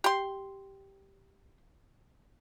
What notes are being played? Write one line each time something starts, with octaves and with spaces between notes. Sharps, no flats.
G4 C6